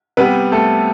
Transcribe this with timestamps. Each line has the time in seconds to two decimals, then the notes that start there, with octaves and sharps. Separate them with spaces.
0.17 C3 G3 B3 B4
0.52 A3 A4